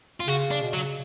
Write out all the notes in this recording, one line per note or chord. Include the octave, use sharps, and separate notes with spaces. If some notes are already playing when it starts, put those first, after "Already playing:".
F4
C#3 F#4
D4
B2
C#3 F#3